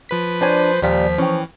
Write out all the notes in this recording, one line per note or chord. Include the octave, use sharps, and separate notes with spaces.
F3 B4 B6
D4 C5 C#5 G#5
D#2 A#2 F3 G3 F5 B6
E3 C#4 G5